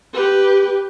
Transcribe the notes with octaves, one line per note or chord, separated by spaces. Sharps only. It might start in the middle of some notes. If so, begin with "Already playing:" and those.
G4 B4